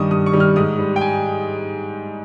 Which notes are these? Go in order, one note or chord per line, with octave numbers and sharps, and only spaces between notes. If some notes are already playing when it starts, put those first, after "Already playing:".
Already playing: G2 D#3 G3 C#6 D#6
G2 D#6
C#6
D#3 G3
F6
G#2 D#6
G3
G5
G#5